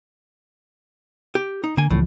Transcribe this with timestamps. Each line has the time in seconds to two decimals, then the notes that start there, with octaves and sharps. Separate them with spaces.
1.35 G4
1.64 D#4
1.77 D3 A#3 G#5
1.90 C#2 A2 E3 F3